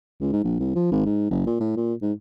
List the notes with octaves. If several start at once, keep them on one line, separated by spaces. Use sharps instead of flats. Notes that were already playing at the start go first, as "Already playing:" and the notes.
C#2
G#2
A#1
C2
F3
G#1
G#2
F#1
A#2
A2
A#2
G#2